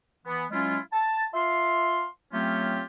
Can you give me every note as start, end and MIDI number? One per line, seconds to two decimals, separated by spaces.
0.26 0.45 52
0.26 0.45 59
0.51 0.79 54
0.51 0.79 56
0.51 0.79 61
0.51 0.79 64
0.51 0.79 65
0.93 1.26 81
1.34 2.06 65
1.34 2.06 76
1.34 2.06 77
1.34 2.06 84
2.33 2.82 54
2.33 2.82 57
2.33 2.82 60
2.33 2.82 61
2.33 2.82 65
2.33 2.82 67